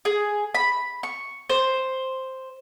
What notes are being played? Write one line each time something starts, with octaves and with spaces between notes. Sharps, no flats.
G#4
B5
C#6
C5